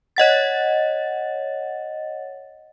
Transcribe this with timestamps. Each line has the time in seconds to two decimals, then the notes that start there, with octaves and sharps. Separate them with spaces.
0.17 C#5 D#5 F#5 A6